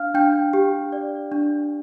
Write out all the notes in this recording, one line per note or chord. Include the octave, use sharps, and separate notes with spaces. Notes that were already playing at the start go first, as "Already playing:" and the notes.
Already playing: D4 F5 F6
D4 G5 G6
G4
D5
D4